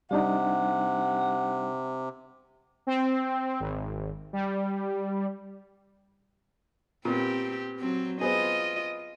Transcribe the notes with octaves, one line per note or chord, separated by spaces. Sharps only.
C3 G3 D4 D#4 F#5
C4
G#1
G3
A#2 B3 C4 G4
F#3 C4
B3 C4 F4 G#4 D#5